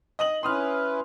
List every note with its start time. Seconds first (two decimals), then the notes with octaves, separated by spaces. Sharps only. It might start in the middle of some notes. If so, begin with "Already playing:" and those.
0.19 D#5 D#6 F#7
0.43 C#4 E4 B4 C6 D#6 F6